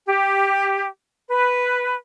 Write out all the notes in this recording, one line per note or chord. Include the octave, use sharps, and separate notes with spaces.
G4
B4